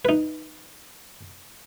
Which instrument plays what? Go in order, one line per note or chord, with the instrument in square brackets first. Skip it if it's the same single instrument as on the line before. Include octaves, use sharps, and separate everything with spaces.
[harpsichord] D#4 B4